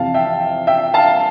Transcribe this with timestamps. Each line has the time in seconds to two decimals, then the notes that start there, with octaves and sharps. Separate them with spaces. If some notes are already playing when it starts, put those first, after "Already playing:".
Already playing: F2 C3 E3 F5 A5
0.14 E5 G5
0.67 E5 G5
0.94 F5 A5